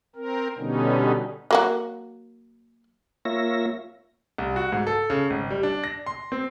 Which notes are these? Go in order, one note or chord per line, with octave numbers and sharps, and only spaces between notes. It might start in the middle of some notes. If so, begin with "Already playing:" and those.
C4 A#4
B2 D3 G3 B3 C#4 D#4
F#3 A#3 F#4
A#3 F4 C#5 E5 A#6
C2
F#4
G#2
A4
C#3
G#1
G3
D4
A#6
C6
C4